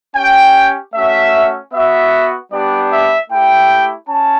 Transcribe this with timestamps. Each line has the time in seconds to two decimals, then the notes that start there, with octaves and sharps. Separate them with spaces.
0.15 C#4 G4 G5
0.94 A3 C#4 F#4 E5
1.73 B3 F#4 E5
2.52 G3 B3 D4 G4 D5
2.91 E5
3.30 A3 E4 G4 G5
4.08 C#4 A5